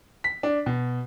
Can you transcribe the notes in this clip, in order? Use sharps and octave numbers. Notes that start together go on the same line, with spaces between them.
B6
D4
B2